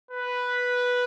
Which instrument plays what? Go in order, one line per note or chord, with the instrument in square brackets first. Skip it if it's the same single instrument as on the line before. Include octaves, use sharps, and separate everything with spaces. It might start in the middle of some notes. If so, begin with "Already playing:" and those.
[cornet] B4